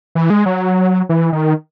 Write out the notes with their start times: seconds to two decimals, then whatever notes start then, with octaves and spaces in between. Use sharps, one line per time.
0.15 E3
0.30 G#3
0.46 F#3
1.09 E3
1.33 D#3